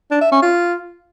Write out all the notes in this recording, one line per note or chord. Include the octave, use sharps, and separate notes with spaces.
D4
E5
C#4
F4